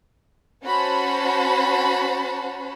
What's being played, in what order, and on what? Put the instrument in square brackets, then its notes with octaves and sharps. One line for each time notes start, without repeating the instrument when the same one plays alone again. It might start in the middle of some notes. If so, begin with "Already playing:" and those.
[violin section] C#4 F#4 C5 A5 B5